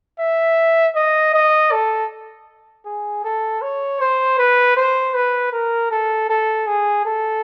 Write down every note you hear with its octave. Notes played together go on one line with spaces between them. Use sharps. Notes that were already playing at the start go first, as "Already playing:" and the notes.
E5
D#5
D#5
A4
G#4
A4
C#5
C5
B4
C5
B4
A#4
A4
A4
G#4
A4